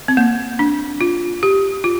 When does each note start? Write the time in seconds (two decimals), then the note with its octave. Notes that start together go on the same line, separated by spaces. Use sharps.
0.08 C4
0.17 A#3
0.59 D4
1.01 F4
1.43 G4
1.84 F4